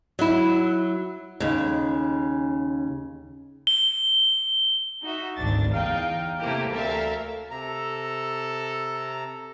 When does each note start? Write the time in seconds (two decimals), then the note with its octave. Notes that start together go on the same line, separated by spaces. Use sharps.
0.19 F#3 E4
1.40 D#2 C#3
3.67 G7
5.03 D#4 F#4 E5
5.36 G#1 D2 D4 A6
5.73 E2 D#4 F5 G5
6.39 C3 A3 A#3 E4 G4
6.71 D2 A4 A#4 E5 F5
7.51 C3 A4 A#5